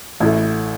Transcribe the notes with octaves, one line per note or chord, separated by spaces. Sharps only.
A1 A2 A3